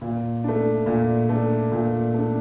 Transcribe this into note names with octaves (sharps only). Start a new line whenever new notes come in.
A#2
A3 D4
A#2
A3 D4
A#2
A3 D4